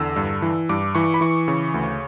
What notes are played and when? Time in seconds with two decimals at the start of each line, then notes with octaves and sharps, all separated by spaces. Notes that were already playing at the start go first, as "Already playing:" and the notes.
Already playing: E2 D3 E6
0.16 G2
0.42 E3
0.69 G2 D6
0.95 E3 C#6
1.14 B5
1.21 E3 C#6
1.48 C#3
1.74 D2